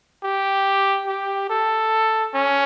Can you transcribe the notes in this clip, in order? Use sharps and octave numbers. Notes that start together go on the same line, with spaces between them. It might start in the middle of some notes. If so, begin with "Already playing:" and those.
G4
G4
A4
C#4